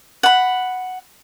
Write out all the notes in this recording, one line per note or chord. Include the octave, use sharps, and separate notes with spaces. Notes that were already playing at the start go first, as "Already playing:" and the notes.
F#5 B5